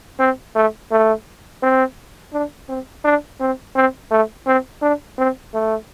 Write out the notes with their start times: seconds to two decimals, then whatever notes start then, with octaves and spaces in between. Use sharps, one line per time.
0.20 C4
0.56 A3
0.91 A3
1.63 C4
2.33 D4
2.69 C4
3.05 D4
3.40 C4
3.76 C4
4.11 A3
4.47 C4
4.82 D4
5.18 C4
5.54 A3